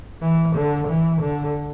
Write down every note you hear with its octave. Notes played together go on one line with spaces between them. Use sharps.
E3
D3
E3
D3